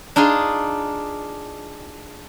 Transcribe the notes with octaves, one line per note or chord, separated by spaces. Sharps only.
D4 D#4 F4 G#4